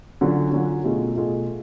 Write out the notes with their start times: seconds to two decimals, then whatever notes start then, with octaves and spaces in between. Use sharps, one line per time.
0.21 D3 F#3 C#4 F4
0.53 D3 F#3 C#4 F4
0.84 B2 A3 F4 G#4
1.16 B2 A3 F4 G#4